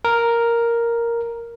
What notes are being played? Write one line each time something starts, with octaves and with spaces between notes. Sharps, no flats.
A#4